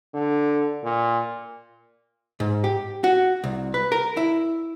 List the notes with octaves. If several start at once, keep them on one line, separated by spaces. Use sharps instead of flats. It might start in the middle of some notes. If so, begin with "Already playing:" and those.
D3
A#2
G#2
G4
F#4
C2
B4
A#4
E4